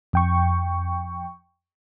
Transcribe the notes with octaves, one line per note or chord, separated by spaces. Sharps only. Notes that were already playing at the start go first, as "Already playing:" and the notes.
F2 G5 C#6